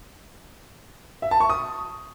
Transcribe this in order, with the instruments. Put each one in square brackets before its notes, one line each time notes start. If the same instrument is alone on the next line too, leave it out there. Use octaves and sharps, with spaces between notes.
[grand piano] E5
A5
C#6
D#6